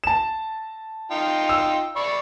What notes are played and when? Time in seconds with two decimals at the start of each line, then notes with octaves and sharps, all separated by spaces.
0.04 A5 E7
1.11 D#4 F4 G5
1.49 E6
1.96 D5 B5 C#6